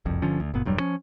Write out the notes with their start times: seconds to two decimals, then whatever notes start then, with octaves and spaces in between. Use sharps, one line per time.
0.05 F#1 C2 F2
0.22 G1 D3 F3 C#4
0.40 D2
0.54 F#1 A#2 B3
0.65 E1 G2 F#3 G3
0.79 F3 C#4